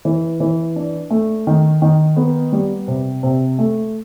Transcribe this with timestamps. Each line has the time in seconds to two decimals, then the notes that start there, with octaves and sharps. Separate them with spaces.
0.05 E3
0.40 E3
0.76 D4
1.10 A3
1.47 D#3
1.82 D#3
2.17 B3
2.52 G3
2.88 C3
3.23 C3
3.59 A3